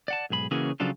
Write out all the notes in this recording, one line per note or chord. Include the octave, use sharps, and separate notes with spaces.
D5 F#5 A5
B1 G#2 G#4 B5
C#3 E3 A#3 C#4 F#4 G#4
C#3 F3 F#3 D4 F4 A4